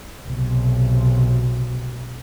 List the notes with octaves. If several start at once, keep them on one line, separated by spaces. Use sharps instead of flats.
B1 C3